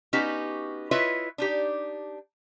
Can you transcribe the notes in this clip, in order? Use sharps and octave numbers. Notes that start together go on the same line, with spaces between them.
B3 C#4 D#4 F#4 G4
E4 F4 B4 C#5 D#5 E5
D4 D#4 G4